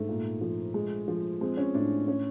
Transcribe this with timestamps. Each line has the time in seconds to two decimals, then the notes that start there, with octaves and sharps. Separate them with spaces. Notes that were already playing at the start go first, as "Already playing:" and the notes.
Already playing: G#2 A3
0.09 A#2
0.41 F3
0.74 G#3
1.08 F3
1.41 G#3 C4
1.57 C#4
1.74 A2 D4
2.08 C#4